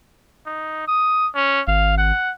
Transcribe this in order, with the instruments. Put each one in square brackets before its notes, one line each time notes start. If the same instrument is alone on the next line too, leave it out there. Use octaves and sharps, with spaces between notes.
[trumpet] D#4
D#6
C#4
[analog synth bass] G#1 [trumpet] F5
[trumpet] F#5